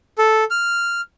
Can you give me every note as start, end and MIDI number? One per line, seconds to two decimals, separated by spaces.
0.18 0.44 69
0.51 1.01 89